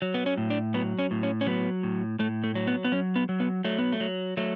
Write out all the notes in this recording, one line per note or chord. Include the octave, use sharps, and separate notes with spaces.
F#3
B3
C#4
A2
D4
F#3 B3
C#4
A2
C#4
C#4
F#3 B3
A2
A2 A3
A3
F#3
B3
B3
F#3 C#4
B3
F#3
B3
F#3 A3
B3
A3
F#3
F#3 A3